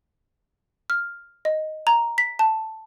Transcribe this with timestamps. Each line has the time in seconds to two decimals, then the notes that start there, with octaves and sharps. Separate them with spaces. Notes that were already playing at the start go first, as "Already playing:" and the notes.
0.90 F6
1.45 D#5
1.87 A#5
2.18 B6
2.39 A5